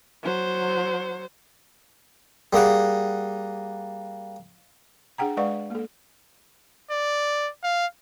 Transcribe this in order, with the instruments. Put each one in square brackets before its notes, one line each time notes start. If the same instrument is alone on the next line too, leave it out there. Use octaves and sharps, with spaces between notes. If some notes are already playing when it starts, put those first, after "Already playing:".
[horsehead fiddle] F#3 C5
[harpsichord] G3 A#3 G#4 F#5
[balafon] D4 G#4 F#5 G5 A#5
G#3 B4 D5 F5 F#5 C#6
A#3 A4
[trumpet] D5
F5